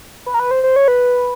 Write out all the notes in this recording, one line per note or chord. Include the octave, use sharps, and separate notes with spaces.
B4
A#4
B4
C5
C5
C#5
B4